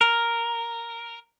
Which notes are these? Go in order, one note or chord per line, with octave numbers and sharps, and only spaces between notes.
A#4